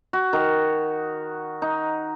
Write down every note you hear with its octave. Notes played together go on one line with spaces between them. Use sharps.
F#4
D#3
D#4